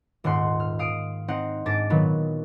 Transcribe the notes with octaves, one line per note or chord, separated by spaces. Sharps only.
D#1 G#2 F#5 C6
F6
F5 D#6 D7
C4 D#4 F#5
G#2 D4 D6 A6 A#6
A#2 D#3 F#3 B3